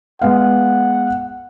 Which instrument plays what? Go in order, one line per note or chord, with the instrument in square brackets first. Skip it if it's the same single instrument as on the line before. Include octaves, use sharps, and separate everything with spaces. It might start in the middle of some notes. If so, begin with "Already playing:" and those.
[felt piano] G#3 B3 F5 [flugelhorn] F#5